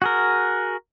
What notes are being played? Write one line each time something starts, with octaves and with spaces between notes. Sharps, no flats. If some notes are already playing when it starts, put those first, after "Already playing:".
F#4 G#4 A#4